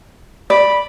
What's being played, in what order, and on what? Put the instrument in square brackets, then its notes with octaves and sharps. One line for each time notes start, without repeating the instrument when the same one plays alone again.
[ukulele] D5 [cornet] B5